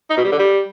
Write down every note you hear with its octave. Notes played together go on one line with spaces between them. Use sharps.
D#4
B2
G3
D3
G3